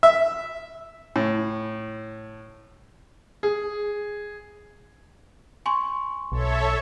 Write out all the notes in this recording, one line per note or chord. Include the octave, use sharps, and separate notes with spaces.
E5
A2
G#4
G#5 C6 C#6
B1 A4 C#5 E5